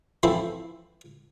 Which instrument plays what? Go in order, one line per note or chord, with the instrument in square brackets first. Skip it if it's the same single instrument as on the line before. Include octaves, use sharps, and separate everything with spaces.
[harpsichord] E3 F3 C4 E4 A4 C5